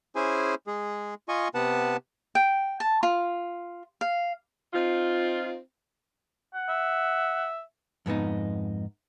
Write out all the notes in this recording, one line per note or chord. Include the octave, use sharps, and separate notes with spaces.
C#4 E4 G#4 C5 G#5
G#3 G#4
F4 D#5 G#5 C#6
C3 B3 B4 F#5 A5
G5
A5
F4
F5
C4 D#4 F4
F#5
E5
F2 G#2 B3 D#4